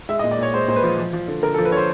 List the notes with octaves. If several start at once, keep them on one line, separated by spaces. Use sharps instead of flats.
G#3 E5
D#5
A#2
D5
A#2 C#5
G#3 C5
A#2 C5
B4
F3
F3
F3
D3
D3 A#4
A4
F3
B4
D3 C5 C#5